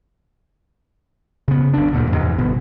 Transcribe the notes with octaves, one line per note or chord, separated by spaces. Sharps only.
C#3 B3
G1 D2 D4
D2 G2 A#2 D3
E2 G#2 C3 G#3
G1 B2 B3